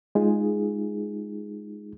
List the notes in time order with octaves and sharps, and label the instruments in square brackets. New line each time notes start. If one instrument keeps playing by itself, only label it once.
[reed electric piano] G#3 D#4 F4 G#4